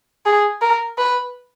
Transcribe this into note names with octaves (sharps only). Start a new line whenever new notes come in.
G#4
A#4
B4